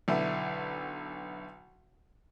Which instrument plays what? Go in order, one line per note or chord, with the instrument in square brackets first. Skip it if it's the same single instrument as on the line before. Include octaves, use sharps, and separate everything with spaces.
[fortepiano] B1 D3 E4